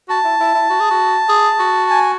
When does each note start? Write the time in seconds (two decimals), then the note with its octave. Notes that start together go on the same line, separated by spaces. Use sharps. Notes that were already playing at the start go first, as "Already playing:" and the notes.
0.09 F#4 A5
0.25 E4
0.40 E4
0.55 E4
0.70 F#4
0.80 G#4
0.91 F#4
1.29 G#4
1.59 F#4
1.90 G#5